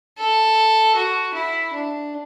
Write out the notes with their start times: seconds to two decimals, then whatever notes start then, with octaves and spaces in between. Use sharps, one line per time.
0.18 A4
0.96 F#4
1.34 E4
1.74 D4